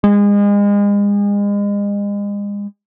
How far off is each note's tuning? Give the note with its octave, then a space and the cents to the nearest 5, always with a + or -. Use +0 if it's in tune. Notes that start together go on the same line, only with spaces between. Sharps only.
G#3 -35